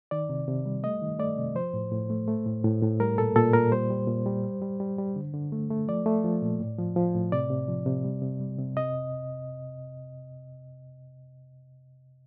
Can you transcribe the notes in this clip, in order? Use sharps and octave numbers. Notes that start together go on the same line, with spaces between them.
D#3 D5
C3
C3
G3
A3 D#5
D#3
A3 D5
C3
F3 C5
A2
A2
A3
A3
A2
A2
A2
G3 A#4
A#2 A4
A#2 A4
A#2 A#4
G3 C5
G3
A#2
G3
G3
G3
G3
G3
D3
D3
A3
A3
F3 D5
A3
F3
A#2
A2
F3
F3
A2
C3 D5
C3
F3
C3
G3
C3
G3
C3
C3 D#5